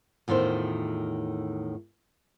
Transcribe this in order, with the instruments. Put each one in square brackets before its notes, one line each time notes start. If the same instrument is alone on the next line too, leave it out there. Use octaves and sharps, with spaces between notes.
[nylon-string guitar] E2 A2 D#3 F4 C5